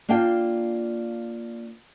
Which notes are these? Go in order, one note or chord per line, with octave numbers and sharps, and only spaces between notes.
A#3 D4 F4 F5 G5